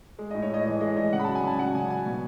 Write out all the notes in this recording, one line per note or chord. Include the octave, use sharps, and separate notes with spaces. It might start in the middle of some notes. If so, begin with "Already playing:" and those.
G#3
A2 D#5
C#5
A2 D#5
E3 D#5
G#3 D#5
A2 D#5
C#3 F#5
B5
F#3 A5
G#5
C#3 A5
F#3 F#5
C#3 G#5
F#3 G#5
B2